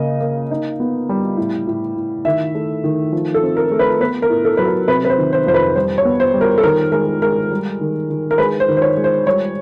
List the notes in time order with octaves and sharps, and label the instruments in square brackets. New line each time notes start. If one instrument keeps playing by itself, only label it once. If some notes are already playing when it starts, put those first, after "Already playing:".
Already playing: [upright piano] C#3 A#3 D#5
A#3
D#4
B3
G3
A2
A2
A2
D#3 E5
A3
D#3
F3
A4
C4
A#4
A3
B4
B3 B4
A#4
A2
A4
F#3 B4
A#4
C3 B4
B4
C5
D#3
C5
F2 C5
B4
G3 C5
C#5
B3
C5
G3
A#4
A4
D#3 A#4
G#3 A#4
G#3 A#4
G3
D#3
D#3
A#4
G#3 B4
C5
D#3
C5
C#5
G#3
C5
G3 C#5